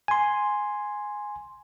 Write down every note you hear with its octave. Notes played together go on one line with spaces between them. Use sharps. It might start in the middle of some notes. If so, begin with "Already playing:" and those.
G#5 C6